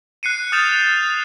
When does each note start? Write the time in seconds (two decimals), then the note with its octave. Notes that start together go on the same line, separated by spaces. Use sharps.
0.23 F#6 C7 C#7 D#7
0.52 D#6 F6 G6 A6 E7 F7